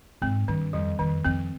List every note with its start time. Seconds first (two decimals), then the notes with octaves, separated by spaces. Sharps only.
0.22 G#2 C4
0.48 G2 D#3
0.73 F2 G3
0.99 F2 D#3
1.25 F2 C4